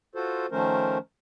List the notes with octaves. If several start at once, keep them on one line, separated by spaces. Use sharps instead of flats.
F4 F#4 A4 C5
D#3 F3 A3 C#4 A#4 C5